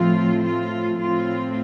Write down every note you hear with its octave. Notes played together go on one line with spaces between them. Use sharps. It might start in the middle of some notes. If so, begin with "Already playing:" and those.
Already playing: A2 F3 A3 C4 F4
F4
A2 A3 C4 F4